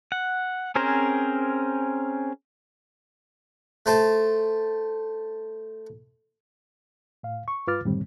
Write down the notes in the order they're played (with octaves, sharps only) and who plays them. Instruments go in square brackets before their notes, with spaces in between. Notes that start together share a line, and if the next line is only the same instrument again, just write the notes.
[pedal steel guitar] F#5
C4 C#4 G#4 A#4 C5
[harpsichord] A3 C5 A5
[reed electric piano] A2 F5
C#6
G2 F4 B4 D6 F6 A6
F#2 A2 D3 D#3 G3 C4